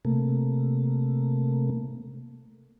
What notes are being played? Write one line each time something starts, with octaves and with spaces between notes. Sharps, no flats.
C3 A3 A#3